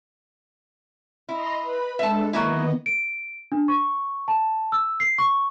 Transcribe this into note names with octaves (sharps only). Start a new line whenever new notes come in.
E4 D#5 A#5 C6
B4 B5
G#3 D4 A4 E5 A5
D#3 F#3 A#3 B3 E4 D#5
D7
D4
C#6
A5
E6
C7
C#6